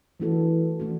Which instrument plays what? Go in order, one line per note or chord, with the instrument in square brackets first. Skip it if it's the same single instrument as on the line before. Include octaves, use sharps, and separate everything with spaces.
[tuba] E3 [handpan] A3 D4 F#4 A4
[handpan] E3 A3 D4 F#4